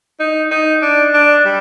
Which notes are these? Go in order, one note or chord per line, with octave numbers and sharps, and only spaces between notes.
D#4
D#4
D4
D4
G3